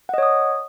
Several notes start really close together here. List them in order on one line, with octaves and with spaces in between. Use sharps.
F#5 D#5 C#5 D#6